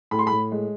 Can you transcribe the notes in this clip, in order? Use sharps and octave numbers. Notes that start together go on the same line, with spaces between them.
A2 B5
C6
B5
A2
G#3